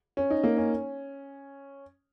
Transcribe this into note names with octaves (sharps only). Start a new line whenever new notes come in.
C#4
D#4
A#3
C#4